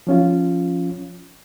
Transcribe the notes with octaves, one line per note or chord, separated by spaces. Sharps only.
F3 C#4 F4